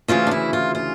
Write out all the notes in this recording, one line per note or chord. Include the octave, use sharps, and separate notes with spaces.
D2 C#3 E3 F4
D4
E4
F4
F4